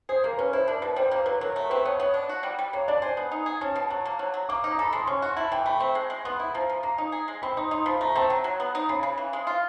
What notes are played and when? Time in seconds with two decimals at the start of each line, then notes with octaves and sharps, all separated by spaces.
0.09 G#4 C5
0.24 A#3 A#4
0.38 C#4 B4
0.53 E4 C5
0.68 D4 A#4
0.82 B2 B4
0.96 G3 C5
1.11 A#3 C5
1.26 F#3 B4
1.41 F#3 A#4
1.56 A3
1.70 C4 B4
1.85 B3 C#5
2.00 B3 C#5
2.14 D4
2.29 F#4
2.43 G3
2.59 G3
2.73 A#3 C#5
2.88 D4 D5
3.02 C5 G#5
3.17 B3
3.31 D#4
3.46 G#4
3.61 C#4 A5
3.76 B2
3.90 F#3 A5
4.05 A#3
4.19 F#3
4.34 F#3
4.49 A#3 D6
4.64 D#4
4.72 A#5
4.79 A4 B5
4.93 G#3 C6
5.07 C#4 C#6
5.22 F#4 C6
5.36 E4 A5
5.52 E3 G5
5.66 A3 B5
5.80 C4
5.95 G#3
6.10 G#3
6.24 B3 C6
6.40 E4 B5
6.54 F3 A#5
6.69 F3
6.83 A#3 A#5
6.98 D#4
7.12 G#4
7.28 G#3
7.42 C4 B5
7.57 D#4 C6
7.71 D#4 C6
7.86 F3 B5
8.01 A3 A#5
8.15 C4 A5
8.30 F#3 A#5
8.44 F#3
8.60 B3
8.75 D#4
8.89 C#3 B5
9.03 C#3
9.18 E3
9.33 G#3
9.47 F4